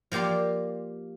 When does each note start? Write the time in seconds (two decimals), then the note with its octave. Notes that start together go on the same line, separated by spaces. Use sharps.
0.12 F3 A#3 G4 C5 D5